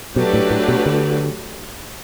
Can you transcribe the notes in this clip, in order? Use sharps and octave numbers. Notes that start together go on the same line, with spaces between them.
B2 F#3 A3 D4 G4 B4
A2
A2
B2
D3